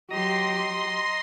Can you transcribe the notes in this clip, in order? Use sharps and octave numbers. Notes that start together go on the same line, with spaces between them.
F#3 G4 D#5 A#5 C6